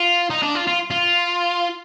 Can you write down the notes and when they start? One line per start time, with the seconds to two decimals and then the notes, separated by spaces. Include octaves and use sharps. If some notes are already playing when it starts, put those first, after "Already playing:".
Already playing: F4
0.30 D#4
0.42 D4
0.55 F4
0.67 F4
0.91 F4